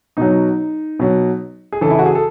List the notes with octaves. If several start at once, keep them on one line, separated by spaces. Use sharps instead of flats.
B2 F#3 D#4
B2 F#3
G#4
C#3 E3 A4
E4
F#4
G#4
A4